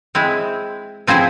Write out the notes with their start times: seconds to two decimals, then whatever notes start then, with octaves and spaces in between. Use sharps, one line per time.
0.15 G#3 C4 E4
1.07 F3 C4 E4 G#4 C5